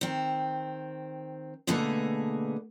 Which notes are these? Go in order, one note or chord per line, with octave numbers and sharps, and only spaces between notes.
D#3 C4
B2 D3 A3 A#3 G#4 B4